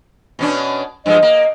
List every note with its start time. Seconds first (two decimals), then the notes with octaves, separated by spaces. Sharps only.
0.39 B2 C#4 D4
1.06 G2 F3 G#3 D#5
1.23 A#3